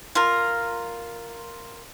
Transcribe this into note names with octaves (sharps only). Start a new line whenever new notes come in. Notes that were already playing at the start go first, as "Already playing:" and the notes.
F4 A#4